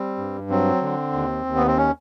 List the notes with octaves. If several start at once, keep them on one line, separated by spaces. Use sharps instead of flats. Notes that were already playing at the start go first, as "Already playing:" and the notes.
Already playing: G3 C4
G2
F#3 C4
D3
D#2
D#2
B3
C4
C#4